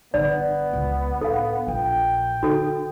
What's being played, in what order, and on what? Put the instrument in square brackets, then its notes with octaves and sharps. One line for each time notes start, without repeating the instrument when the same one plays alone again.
[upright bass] G1 D3 [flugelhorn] B3 [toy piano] D5
[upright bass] C#2
[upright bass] A2 [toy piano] A4 F5
[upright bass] A#1 E3 [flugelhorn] G5
[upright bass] D3 [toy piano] F#4 A4